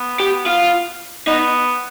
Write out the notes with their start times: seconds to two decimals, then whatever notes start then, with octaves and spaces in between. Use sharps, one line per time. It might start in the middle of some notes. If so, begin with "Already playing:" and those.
Already playing: B3
0.20 G4
0.46 F4
1.27 B3 D#4